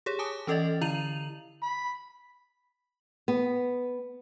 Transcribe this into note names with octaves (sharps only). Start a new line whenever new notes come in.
G4 G#4 C#5
G#5 A5 D6 D#6
E3 C#4 A4 D5 D#5 A6
D3 E4 A#5 D#7 F7 F#7
B5
B3